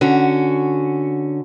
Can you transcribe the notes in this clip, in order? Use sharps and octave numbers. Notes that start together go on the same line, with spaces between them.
D3 C#4 F#4